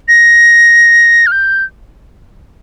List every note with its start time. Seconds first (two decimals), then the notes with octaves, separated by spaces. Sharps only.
0.08 A#6
1.27 F6
1.32 G6